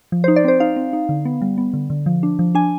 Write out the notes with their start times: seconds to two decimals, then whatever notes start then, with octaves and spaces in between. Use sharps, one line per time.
0.12 F3
0.24 C5
0.28 D#4
0.36 D5
0.44 C4 C5
0.60 D#4 F5
0.76 C4
0.93 D#4
1.09 D3
1.25 B3
1.42 G3
1.58 B3
1.73 D3
1.90 D3
2.06 F3
2.23 D4
2.39 F3
2.55 D4 G#5